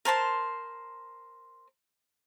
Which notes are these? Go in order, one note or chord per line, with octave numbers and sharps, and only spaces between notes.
A#4 C5 A5 C6